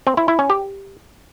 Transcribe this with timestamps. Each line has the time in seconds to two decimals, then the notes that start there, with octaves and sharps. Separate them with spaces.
0.07 C4
0.17 E4
0.28 E4
0.39 C#4
0.50 G4